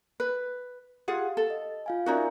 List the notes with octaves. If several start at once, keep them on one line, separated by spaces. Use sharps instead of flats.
B4
F4 G4 G#4 F5 F#5
A4
D#5
F4 F5 G#5
C#4 D#4 F#4 A#4 D5 E5